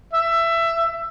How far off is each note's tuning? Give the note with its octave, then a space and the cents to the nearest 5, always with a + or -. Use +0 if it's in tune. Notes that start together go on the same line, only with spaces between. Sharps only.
E5 +15